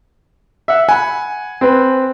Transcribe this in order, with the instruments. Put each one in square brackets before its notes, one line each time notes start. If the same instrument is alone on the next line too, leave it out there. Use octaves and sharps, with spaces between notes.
[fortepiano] E5 F#5
[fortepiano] F#5 B5 [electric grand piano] G#5
[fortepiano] C4 B4